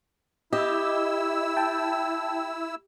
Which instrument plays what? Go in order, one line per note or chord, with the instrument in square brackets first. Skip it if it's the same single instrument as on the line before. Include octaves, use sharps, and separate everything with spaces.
[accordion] E4 E6 [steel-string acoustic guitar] G4 [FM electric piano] D#5
[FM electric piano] G5 A5